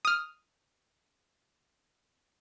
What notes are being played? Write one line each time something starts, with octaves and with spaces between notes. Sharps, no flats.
D#6 F6